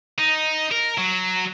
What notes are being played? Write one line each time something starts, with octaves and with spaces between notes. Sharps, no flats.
D#4
A#4
F#3